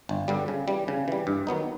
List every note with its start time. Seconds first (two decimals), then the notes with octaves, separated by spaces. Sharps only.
0.09 G1
0.28 G2 D3 G3
0.48 C#3
0.68 E3 G3
0.88 C#3
1.08 E3 G3
1.27 G2
1.47 D#3 F#3 B3 D#4